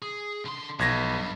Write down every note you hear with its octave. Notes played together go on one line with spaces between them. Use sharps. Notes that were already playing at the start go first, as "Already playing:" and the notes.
G#4
D3 C6
B1 F3 B4 G#6 A#6
G2